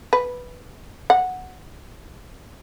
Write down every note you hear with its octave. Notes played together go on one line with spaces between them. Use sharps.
B4
F#5